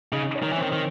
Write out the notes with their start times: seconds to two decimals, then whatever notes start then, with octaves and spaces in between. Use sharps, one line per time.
0.13 C#3 D#4
0.36 C#4
0.43 D#3
0.53 E3
0.58 D#3 C4
0.73 D#3